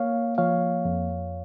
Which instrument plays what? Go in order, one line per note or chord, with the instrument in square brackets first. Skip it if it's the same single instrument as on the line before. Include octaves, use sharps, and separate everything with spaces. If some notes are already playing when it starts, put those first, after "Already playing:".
Already playing: [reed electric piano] A#3 C#5 F5
F3 C#5 F5
F2